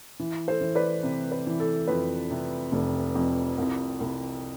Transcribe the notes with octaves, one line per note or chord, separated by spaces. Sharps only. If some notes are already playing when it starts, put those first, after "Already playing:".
E3
A4 C5
E3
B4 D5
C3
B4
E3
A4
F2 B4
C3
F1
F2
C2
C2